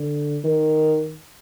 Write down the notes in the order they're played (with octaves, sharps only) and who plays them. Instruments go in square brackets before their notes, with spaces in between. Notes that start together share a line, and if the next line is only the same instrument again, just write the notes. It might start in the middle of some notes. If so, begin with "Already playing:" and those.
Already playing: [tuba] D3
D#3